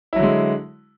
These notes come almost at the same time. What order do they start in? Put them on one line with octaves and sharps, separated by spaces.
E4 F#3 D3 G#3